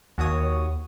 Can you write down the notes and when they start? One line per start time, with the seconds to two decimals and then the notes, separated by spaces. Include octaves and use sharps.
0.18 D#2 F#4 C#5 D#6